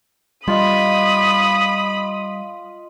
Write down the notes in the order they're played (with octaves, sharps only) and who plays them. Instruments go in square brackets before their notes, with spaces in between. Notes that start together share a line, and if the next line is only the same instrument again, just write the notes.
[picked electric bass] G3 [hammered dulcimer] F4 D#5 [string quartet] B5 [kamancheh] D#6